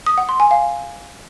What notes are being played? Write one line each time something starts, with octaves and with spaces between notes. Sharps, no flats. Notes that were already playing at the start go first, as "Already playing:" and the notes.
D#6
F#5
C6
G#5
F5